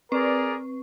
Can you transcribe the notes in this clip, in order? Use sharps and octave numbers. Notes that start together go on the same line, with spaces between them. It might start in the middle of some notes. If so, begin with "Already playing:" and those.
C4 G#4 A#4 B4 D5 C#6